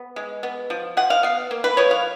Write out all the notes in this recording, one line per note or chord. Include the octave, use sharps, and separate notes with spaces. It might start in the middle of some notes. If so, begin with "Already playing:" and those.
Already playing: B3
G#3
B3
F3
F3 F#5
F5
B3 F5
A#3
B4
F3 C#5
F5